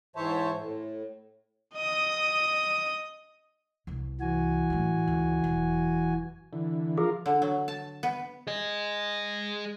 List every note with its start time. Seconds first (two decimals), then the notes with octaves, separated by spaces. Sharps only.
0.16 G#2 E3 C5 C#5 E5 A5
0.58 A2
1.75 D#5 D#6
3.87 C2 B3
4.20 E3 F#4 G#5
4.70 A2 F#3
5.08 C#2
5.44 E1 F#2
6.53 D3 E3
6.98 F3 F4 G#4 A#4
7.26 D3
7.42 F#3
7.68 A5
8.03 B3
8.47 G#4 D#5